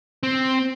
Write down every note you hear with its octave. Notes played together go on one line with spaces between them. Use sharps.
C4